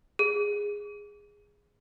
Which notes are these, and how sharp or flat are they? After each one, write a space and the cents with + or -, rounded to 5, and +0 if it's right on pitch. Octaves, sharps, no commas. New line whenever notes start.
G#4 -10